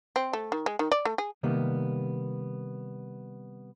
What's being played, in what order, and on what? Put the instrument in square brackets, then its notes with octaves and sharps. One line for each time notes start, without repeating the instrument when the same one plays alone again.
[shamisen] C4
A3
D#3
G#3
D#3
D5
A3
G#4
[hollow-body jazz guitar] C3 D#3 G3 A#3 B3